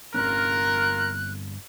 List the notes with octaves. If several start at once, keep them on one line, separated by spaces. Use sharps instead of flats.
G1 C4 C#4 F4 A#4 F#6